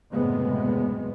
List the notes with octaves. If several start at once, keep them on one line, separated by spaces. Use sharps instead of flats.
F#1 E2 A2 C3 G#3 B3